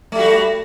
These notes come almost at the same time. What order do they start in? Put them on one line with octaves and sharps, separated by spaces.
A3 G3 F#4